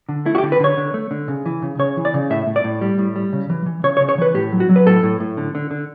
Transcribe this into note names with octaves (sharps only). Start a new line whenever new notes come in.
D3
A3 E4
F#4
G4
D3
B4
D3 C#5
D3
A3
D3
C#3
E3
C#3
C#3 C#5
E3
D5
C#3
A2 E5
A2
D5
A2
G3
A2
G3
C#3
E3
E3
C#3 C#5
C#5
C#3
C#5
E3 B4
A2 G4
F#3
F#4
F#3
B4
A2 A4
A2
A2
D3
D3
D3